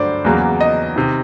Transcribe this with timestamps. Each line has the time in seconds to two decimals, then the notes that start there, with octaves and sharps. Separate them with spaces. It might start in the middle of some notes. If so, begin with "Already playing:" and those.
Already playing: G2 D3 F#3 A3 C5 D5
0.24 E2 C#3 F#3 A#3
0.61 D#5
0.96 C3 D#3